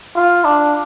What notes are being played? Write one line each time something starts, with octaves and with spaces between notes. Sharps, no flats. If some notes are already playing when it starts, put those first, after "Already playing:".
F4
D4